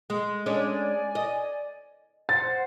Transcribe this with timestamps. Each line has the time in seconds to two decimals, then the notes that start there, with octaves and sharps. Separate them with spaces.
0.10 G#3
0.46 G#3 C#4 D4 D5 G#5
1.15 D#5
2.29 C5 F#5 A6